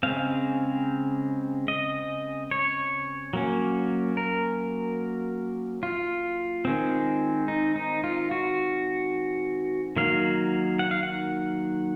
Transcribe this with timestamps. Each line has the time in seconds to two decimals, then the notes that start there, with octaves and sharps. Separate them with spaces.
0.03 C#3 G#3 C4 F5
1.68 D#5
2.51 C#5
3.33 F#3 A#3 C#4
4.17 A#4
5.83 F4
6.65 D#3 G#3 C4
7.48 D#4
7.76 D#4
8.04 F4
8.31 F#4
9.96 D#3 F#3 A#3 F5
10.79 F#5
10.91 F5
11.03 F#5